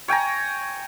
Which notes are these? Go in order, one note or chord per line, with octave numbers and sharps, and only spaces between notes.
C#5 G5 G#5 A#5